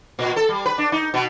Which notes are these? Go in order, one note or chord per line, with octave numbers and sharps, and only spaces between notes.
A#2
A4
G3
B4
D4
D#4
B2